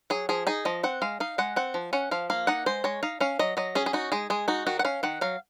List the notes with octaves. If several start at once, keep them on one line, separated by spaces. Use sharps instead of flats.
F#3 G#4
F3 G#4
D#4 G#4
F3 D#5
C4 F#5
G#3 F5
D#4 F5
G#3 F#5
C4 F#5
F3
C#4 F#5
F3 F5
A#3 F5
D#4 F#5
G#3 C5
G#3 C#5
D#4 F5
C#4 F5
F#3 D#5
F#3 D#5
C#4 G#4
G#4
D#4 F#4
G#3 G#4
G#3 G#4
D#4 F#4
D#3 F#4
F#5
C#4 F5
D#3 F#5
F#3 F5